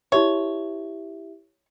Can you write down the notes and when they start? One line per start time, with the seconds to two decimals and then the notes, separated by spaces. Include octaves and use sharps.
0.12 E4 G4 C#5 E5